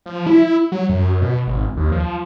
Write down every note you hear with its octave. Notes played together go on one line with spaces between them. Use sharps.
F3
E4
F#3
F#2
B2
G#1
D#2
F3